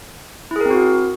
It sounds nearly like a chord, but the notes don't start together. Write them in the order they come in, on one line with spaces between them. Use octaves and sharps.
E4 G#4 A#4 C4 F#4